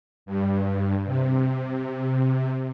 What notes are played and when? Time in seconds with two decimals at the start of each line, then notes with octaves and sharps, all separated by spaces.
0.26 G2
1.05 C3